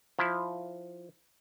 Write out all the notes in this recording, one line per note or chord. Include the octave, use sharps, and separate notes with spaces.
F3 E4